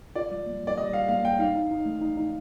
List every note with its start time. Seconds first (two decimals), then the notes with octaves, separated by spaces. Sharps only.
0.15 F4 D5
0.31 G3
0.46 A#3
0.62 G3
0.67 D5
0.77 G3 D#5
0.93 G3 F5
1.08 A#3 F5
1.24 A#3 G5
1.39 D#4 F5
1.55 D#4
1.71 D#4
1.86 A3
2.01 D#4
2.17 D#4